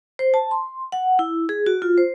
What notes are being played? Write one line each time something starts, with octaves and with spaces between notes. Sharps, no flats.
C5
A5
C6
F#5
E4
G#4
F#4
F4
C5